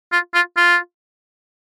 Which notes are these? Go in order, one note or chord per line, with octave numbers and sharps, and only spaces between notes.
F4
F4
F4